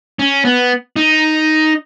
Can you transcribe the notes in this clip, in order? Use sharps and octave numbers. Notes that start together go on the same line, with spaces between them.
C#4
B3
D#4